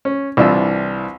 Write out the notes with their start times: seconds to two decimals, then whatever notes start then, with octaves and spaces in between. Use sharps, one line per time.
0.05 C#4
0.37 C2 E3 C4 D4 F4 E6